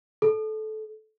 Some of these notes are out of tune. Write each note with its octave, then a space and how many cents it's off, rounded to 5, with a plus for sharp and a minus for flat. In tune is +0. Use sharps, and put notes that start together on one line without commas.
A4 -20